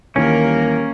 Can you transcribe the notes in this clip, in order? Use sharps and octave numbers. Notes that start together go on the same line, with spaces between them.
D#2 E3 G3 A#3 C#4 A#4 D7